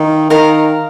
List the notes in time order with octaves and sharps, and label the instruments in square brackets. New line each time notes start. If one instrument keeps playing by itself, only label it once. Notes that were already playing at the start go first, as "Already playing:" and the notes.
Already playing: [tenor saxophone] D#3 [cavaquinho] F5
[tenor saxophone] D#3 [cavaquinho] A#4 F5 A#5